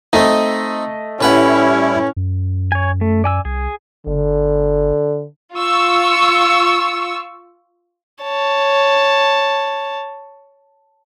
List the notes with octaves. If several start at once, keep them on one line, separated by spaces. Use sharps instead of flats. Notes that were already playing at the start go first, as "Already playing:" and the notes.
A3 C4 D#4 D#5
A2 G3 C#4 E4 B4 F#5
F#2
C#5 G#5
A3
D5 G#5 E6
C2 G#4
G1 D3
F4 C#6 E6
C#5 A5